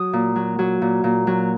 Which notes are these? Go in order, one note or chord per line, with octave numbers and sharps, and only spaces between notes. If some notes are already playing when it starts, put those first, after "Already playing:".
Already playing: F#3 D#6
A#2
F#3
F#3
A#2
A#2
F#3